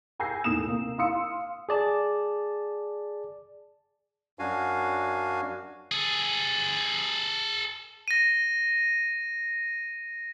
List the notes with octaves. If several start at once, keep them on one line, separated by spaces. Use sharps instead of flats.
G5 G#5 E6 G6 A#6 C7
D#2 A2 D#6 E7
C3 A#3
F5 C6 D#6 E6 C#7
G#4 D5 A5
F#2 D4 F#4 F5 G#5
G#4 A4
A#6 D#7